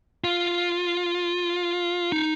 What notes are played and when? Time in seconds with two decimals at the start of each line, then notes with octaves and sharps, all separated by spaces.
0.24 F4
2.12 D#4